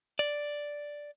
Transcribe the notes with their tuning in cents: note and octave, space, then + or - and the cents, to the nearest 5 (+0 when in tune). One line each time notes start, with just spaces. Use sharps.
D5 +0